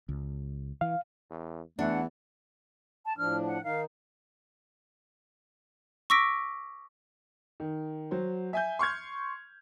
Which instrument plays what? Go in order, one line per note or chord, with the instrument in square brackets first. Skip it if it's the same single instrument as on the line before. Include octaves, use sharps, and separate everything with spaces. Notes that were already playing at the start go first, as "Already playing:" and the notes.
[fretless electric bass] C#2
[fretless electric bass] E3 [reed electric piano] F5
[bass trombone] E2
[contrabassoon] E2 [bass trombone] E3 [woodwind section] A3 F#5 [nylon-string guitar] D4
[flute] A5
[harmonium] A2 F3 D4 [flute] F6
[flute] F#5
[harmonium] D#3 D#4 [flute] F5
[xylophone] C#6 D6 E6 A#6 B6 D7
[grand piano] D#3
F#3 C5
E5 G#5 G6
C6 C#6 F6 G#6